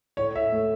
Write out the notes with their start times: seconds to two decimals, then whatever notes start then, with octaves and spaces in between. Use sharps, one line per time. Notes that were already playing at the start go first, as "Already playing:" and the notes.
0.17 A2 C#5
0.35 A2 E5
0.52 A3